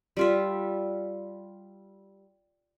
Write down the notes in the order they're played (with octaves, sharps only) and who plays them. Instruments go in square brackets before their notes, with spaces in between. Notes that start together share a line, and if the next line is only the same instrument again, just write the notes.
[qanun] G3 F4 E5